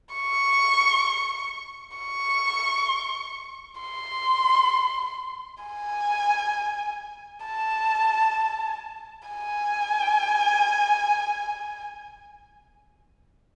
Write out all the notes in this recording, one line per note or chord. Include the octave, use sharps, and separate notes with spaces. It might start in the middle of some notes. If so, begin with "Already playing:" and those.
C#6
C#6
C6
G#5
A5
G#5